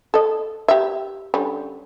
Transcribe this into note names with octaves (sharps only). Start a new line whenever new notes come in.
A4 D#5
G4 E5
D3 G3 C#4